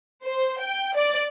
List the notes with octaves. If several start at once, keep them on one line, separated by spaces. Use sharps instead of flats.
C5
G5
D5